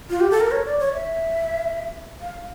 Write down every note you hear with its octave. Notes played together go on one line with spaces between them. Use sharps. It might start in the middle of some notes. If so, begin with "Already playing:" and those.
F4
G4
A4
A#4
C#5
D5
C#5
E5
F5